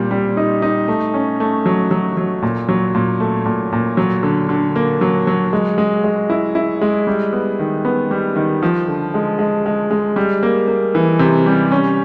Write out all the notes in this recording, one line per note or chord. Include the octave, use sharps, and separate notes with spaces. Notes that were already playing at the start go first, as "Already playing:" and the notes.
Already playing: A#2 G3 C4
G3
D#4
D#4
A3
C#4
A3
F#3
F#3
F#3
A#2
F#3
A#2
A3
A#2
A#2
F#3
D3
D3
A#3
F#3
F#3
G#3
G#3
G#3
E4
E4
G#3
G3
B3
D#3
B3
G3
D#3
F3
D3
G#3
G#3
G#3
G#3
G3
A#3
A#3
E3
C3
G3
C#4